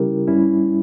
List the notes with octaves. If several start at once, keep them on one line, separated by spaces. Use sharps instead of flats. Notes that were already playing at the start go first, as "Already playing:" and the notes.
Already playing: C#3 G3 C#4 E4 G4 A#4
G2 G3 C#4 E4